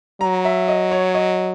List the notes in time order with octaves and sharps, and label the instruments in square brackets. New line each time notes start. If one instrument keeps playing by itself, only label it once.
[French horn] F#3 [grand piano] A#5
[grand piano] E5
D#5
C#5
D#5